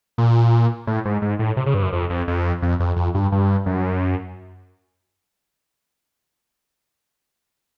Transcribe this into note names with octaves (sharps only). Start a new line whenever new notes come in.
A#2
A2
G#2
G#2
A2
C3
C#3
G2
F#2
F2
F2
F2
F2
F2
F2
G2
G2
F#2